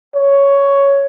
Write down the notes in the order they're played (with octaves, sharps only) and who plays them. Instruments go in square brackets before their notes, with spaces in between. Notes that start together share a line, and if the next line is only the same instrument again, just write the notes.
[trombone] C#5